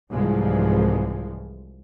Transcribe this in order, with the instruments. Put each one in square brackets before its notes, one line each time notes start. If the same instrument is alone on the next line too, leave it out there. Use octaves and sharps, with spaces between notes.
[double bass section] C2 G#2 E3 F3 G#3